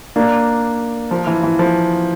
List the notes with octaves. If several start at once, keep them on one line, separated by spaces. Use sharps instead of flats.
A#3 D4
F3
E3
E3
F3